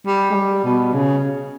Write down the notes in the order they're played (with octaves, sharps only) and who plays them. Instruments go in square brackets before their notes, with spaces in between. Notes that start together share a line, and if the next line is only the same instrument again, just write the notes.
[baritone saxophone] G3
G#3
G3
B2
C#3